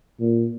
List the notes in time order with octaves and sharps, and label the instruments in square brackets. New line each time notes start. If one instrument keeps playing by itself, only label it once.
[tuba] A#2